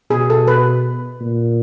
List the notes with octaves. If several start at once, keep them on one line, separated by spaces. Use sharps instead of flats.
B2 G#4
A4
B4
A#2